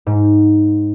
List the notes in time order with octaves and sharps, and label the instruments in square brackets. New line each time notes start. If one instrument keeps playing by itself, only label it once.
[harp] G#2